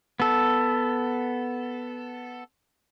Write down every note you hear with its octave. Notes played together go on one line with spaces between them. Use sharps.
B3 A4